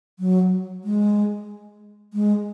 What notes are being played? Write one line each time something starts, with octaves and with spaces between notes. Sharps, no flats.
F#3
G#3
G#3